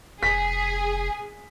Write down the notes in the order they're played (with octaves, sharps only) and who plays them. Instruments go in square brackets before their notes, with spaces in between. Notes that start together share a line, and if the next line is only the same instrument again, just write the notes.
[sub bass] F1 [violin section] G#4 [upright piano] B6